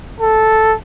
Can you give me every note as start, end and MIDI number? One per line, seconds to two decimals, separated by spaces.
0.21 0.75 69